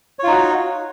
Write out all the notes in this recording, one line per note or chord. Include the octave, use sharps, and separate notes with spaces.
D#4 F4 F#4 C#5